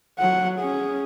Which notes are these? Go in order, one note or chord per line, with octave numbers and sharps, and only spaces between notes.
F#3 F#5
C#4 G#4